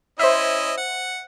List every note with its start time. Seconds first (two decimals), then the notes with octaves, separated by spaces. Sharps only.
0.19 C#4 E4 C5 D#5 E5
0.78 F#5